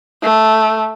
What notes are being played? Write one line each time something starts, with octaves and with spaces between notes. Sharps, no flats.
A3